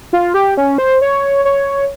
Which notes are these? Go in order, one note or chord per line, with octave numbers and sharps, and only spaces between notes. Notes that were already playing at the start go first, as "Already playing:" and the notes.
F4
G4
C#4
C5
C#5
C#5